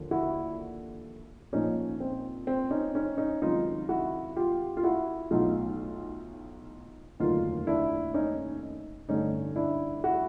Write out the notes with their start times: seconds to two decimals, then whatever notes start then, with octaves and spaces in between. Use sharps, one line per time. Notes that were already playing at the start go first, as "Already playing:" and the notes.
Already playing: D#2 D3 F3
0.11 E4 F#4
1.53 A#1 A#2 F3 C#4 D#4
2.00 C4
2.47 C4
2.71 C#4 D#4
2.95 C#4 D#4
3.18 C#4 D#4
3.42 C#2 C3 D#3 F#3 D#4 F4
3.89 E4 F#4
4.36 F4 G4
4.77 F4
4.83 E4 F#4
5.31 B1 A2 F#3 D#4 F4
7.20 F1 D#2 D3 F#3 D#4 F4
7.67 D4 E4
8.14 C#4 D#4
9.09 A1 G2 D3 C#4 D#4
9.56 D4 E4
10.04 E4 F#4